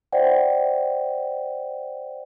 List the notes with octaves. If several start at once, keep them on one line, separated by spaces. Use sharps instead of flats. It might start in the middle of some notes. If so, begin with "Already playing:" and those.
C5 D5 E5 F#5 G5